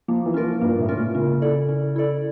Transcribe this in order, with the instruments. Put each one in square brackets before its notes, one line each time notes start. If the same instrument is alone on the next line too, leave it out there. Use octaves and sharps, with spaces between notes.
[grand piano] F3 [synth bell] A#3
[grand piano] E3
[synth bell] C#4 F4 A#4
[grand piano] F3
[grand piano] G2 [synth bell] A#3
[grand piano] A2
[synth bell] C#4 F4 A#4
[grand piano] A#2
[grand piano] C#3 [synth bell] C#4
[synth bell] E4 A4 D5
C#4
E4 A4 D5